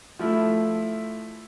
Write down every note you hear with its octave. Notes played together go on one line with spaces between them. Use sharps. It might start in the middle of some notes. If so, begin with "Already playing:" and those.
F3 A3 E4